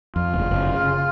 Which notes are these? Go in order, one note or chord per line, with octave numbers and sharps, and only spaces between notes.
F2 F4
F#1
F#1
C#3